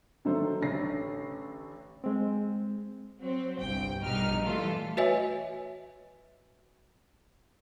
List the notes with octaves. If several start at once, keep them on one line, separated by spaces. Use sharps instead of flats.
D3 D#3 F#3 A3 A4 C5
A1 D3 C#5 A#6 C7
G#3 C4
F#3 C4
G1 C2 G5
A#1 G2 B2 D#4 F6
E3 G3 A3 F4 A4
F#4 B4 C#5 D#5 E5 G#5